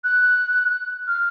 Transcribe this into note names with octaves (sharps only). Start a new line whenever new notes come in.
F#6
F6